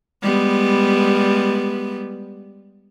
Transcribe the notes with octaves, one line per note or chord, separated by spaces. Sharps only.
G3 G#3 B3